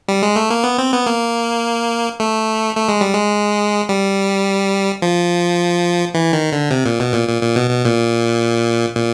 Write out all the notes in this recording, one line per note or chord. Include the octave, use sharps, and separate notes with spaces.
G3
G#3
A3
A#3
B3
C4
B3
A#3
A3
A3
G#3
G3
G#3
G3
F3
E3
D#3
D3
C3
A#2
B2
A#2
A#2
A#2
B2
B2
A#2
A#2